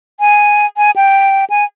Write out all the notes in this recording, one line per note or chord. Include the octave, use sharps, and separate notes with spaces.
G#5
G#5
G5
G#5